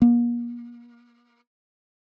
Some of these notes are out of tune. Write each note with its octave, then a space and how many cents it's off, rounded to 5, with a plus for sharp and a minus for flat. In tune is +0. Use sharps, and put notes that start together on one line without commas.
A#3 +40